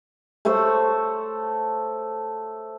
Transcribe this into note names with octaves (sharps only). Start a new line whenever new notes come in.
A3 A4 C5 C#5